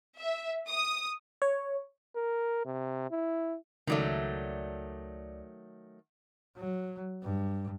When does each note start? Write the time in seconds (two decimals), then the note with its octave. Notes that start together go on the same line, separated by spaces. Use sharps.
0.18 E5
0.69 D#6
1.42 C#5
2.16 A#4
2.65 C3
3.11 E4
3.87 C#2 D#3 F#3 A3 D5
6.57 F#3
7.23 G2